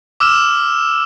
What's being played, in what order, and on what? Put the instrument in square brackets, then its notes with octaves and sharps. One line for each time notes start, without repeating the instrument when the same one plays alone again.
[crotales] D6 E6 F6 E7